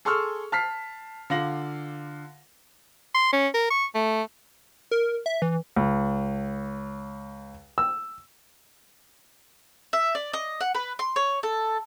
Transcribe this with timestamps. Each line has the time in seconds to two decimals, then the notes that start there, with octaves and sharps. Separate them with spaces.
0.05 G#4 A4 C6 C#6 E6 F6
0.52 A5 F6 B6 C7
1.30 D3 F4 F5 A#6 F#7
3.15 C6
3.33 C#4
3.54 A#4
3.71 C#6
3.95 A3
4.91 A#4
5.26 E5
5.42 E3
5.76 C#2
7.78 E6
9.93 E5
10.15 D5
10.33 D#5
10.61 F#5
10.75 B4
10.99 C6
11.16 C#5
11.43 A4